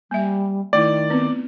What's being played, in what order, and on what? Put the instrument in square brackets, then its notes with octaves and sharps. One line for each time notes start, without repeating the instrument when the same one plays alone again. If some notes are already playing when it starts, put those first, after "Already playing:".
[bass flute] G3 [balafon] A#3 E5
[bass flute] D#3 [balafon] A3 D#4 E4 [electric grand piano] D5
[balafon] B3 C4 B4